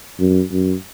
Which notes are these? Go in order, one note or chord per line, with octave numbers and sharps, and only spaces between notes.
F#2
F#2